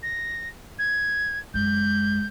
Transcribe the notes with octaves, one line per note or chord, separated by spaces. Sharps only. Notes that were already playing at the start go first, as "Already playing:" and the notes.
A#6
G#6
F#2 G#3 G6